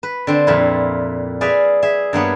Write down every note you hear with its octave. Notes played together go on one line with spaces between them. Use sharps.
B4
D3 C4 D4
F2 A#2 E4 B4
G#4 B4 D5 E5 F5 G#5
G#4 E5
G2 A#3 B3 C#5